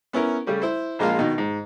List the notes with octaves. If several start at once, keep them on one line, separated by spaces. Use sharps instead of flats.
B3 C#4 E4 A#4
C#3 G3 A3
E4 C5
A#1 G#3 A#3 F4 F5
B2 D#3 D#4
G#2